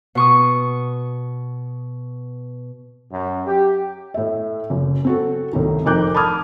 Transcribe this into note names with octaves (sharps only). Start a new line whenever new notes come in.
B2 C#6 D#6
F#2
G4
A2 E5
F#1
C4 F#4 A4
C2 A2 D#3
F1 D#4 A#4 D6 F#6 G6
A5 B5 D6 D#6 F6 G#6